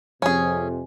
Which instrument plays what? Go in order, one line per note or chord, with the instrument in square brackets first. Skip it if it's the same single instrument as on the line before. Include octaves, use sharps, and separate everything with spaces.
[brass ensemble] F2 C3 [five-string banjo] C#4 G#4 [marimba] G#5